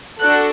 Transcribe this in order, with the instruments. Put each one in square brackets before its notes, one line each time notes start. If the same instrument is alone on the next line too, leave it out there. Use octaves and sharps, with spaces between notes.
[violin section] D4 F#4 A4 F#6